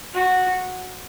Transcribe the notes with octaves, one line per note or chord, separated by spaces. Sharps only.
F#4